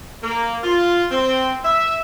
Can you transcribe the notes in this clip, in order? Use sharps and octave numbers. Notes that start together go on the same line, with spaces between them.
A#3
F4
C4
E5